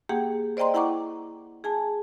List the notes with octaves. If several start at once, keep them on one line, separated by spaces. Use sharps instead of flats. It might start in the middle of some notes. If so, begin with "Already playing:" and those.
A#3 G4 G#4 F#5 G5
C5 D5 D#5 G5 A#5 C6
E4 F#5 G5 A#5 C#6 D6
G#4 G#5 A5